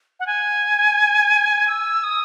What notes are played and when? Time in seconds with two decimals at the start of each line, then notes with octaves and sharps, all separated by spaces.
0.20 F#5
0.27 G#5
1.68 E6
2.04 D#6